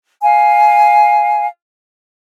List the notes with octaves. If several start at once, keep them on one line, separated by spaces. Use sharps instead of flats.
F5 G#5